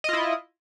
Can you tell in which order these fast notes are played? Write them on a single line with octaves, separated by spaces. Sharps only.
D#5 F4 E4